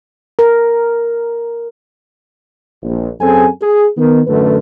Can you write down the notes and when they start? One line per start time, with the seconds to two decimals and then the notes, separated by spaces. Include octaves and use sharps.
0.39 A#4
2.82 A#1
3.20 F#2 C4 G#4 A4 G#5
3.61 G#4
3.96 D#3 B3
4.27 A1 F#2 D3 A3 B4